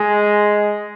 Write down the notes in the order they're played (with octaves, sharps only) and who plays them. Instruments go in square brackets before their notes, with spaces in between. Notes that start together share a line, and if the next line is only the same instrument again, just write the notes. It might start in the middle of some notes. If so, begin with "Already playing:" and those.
Already playing: [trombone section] G#3